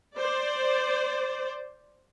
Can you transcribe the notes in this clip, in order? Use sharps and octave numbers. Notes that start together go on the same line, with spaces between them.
C5 D5